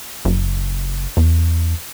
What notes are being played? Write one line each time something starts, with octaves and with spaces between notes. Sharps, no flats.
F#1
E2